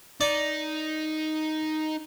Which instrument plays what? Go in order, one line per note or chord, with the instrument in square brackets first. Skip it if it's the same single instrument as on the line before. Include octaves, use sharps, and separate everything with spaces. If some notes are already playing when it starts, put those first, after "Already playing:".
[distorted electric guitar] D#4 [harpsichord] D5